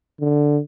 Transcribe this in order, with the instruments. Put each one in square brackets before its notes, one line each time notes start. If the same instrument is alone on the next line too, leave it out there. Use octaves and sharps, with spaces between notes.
[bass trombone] D3